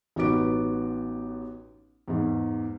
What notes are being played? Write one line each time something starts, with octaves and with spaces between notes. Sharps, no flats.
A1 B3 D#4 F#4 D6 D7
E2 G#2